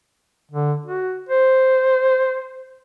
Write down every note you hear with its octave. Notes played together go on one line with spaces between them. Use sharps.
D3
F#4
C5